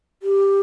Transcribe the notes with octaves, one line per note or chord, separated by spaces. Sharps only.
G4